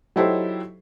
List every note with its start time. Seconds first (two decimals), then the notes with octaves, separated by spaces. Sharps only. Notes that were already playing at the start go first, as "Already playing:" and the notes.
0.16 F#3 D#4 E4 G4 A4 C5